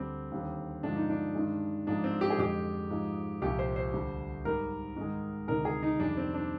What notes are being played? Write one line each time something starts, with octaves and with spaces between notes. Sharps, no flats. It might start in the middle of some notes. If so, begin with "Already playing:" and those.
Already playing: D2 D3 G3 C4
D#2 D3 G3
G2 D3 F3 G#3 D4
D#4
D4
G2 D#3 G#3
G#2 F3 G#3 D4
C4
G4
G#4
F2 D3 G#3 G4
G#2 F3 G#3
C2 A#2 F3 G4
C5
C5
D2 D3 G3
G#2 G3 A#4
G#2 D#3 G#3
D2 C3 D#3 G#3 A#4
G#4
D#4
F2 C3 D#3 G3 D4
C4
D4